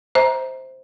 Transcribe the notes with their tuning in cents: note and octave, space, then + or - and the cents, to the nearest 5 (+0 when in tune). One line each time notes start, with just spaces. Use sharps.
C5 +0 E5 -35 A#5 +15